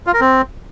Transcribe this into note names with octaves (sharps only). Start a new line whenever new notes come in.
F4
A#4
C4